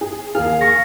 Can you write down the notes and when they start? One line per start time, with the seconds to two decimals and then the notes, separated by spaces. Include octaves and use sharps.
0.01 G#4
0.35 D#2 G#4 A#4 F5 F6
0.61 C#6 A#6